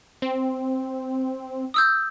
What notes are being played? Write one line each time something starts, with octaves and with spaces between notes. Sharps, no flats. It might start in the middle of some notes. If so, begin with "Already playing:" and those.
C4
D#6 E6 G6